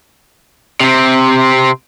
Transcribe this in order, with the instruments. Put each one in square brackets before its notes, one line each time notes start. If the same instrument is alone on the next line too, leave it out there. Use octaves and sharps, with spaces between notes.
[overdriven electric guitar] C3 C4